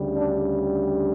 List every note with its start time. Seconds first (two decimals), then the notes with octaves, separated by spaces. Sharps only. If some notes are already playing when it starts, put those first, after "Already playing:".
Already playing: D2 C#3 G3
0.16 D4